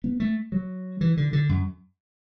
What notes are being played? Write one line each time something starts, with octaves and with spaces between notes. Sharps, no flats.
B3
A3
F#3
E3
D3
D3
F#2